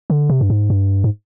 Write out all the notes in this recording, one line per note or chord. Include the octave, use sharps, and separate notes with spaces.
D3
C3
G2
G#2
G2
G#2